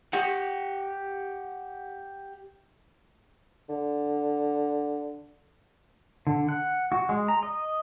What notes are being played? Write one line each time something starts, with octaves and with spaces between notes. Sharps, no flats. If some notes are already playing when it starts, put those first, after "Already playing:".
G4 F#5
D3
D3
F#5
F#4
G#3
A#5
D#5